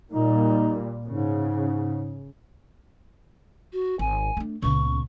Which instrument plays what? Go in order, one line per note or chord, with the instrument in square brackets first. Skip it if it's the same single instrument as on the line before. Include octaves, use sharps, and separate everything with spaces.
[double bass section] A#2 G3 A#3 [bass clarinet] D#4
[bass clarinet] G#2 [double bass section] C#3
[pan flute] F#4
[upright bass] G#1 [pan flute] G#5
[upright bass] A3 D4
[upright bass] C#2 B3 [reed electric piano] A#2 C#3 [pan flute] C#6